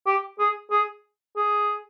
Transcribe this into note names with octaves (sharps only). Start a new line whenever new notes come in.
G4
G#4
G#4
G#4